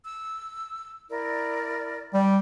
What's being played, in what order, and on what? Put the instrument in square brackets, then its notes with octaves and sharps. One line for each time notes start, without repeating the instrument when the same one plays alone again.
[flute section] E6
E4 A#4 D5
[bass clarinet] G3 [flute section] D5 G5